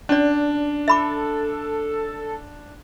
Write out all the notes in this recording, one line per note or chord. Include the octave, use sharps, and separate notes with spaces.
C#4 D4 D5
A4 E5 B5 D6